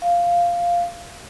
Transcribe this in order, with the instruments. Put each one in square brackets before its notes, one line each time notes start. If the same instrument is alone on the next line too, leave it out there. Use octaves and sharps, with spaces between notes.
[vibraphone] F5